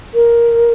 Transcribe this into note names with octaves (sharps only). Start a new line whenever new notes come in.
A#4